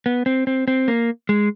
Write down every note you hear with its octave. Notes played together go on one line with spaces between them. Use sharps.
B3
C4
C4
C4
A#3
G#3